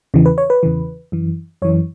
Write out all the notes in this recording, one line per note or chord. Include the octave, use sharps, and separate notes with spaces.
E2 C#3 E3
B4
C#5
B4
E2 C#3 E3
F#2 E3
F#2 E3 C#5